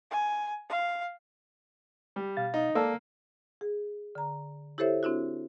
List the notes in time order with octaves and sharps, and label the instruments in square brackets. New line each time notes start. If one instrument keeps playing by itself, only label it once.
[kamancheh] G#5
F5
[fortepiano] G3
[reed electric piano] B2 F5 A6
[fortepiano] D#4
[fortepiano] A#3 E6 [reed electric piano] A4 D5 A5
[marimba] G#4
D3 A#5
E4 G4 A4 C5 C#5 E5
C4 D4 E4 F#4